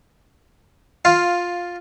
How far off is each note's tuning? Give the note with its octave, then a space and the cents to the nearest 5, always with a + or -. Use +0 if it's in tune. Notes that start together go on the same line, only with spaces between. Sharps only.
F4 +10 F5 +0